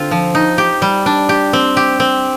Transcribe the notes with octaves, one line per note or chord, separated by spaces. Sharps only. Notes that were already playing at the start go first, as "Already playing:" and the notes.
Already playing: D3 C4 F4
F3
D#4
G4
G3
D4
G4
C4
G4
C4